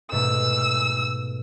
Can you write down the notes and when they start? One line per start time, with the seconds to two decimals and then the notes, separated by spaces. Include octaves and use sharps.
0.12 G#2 B2 A3 E6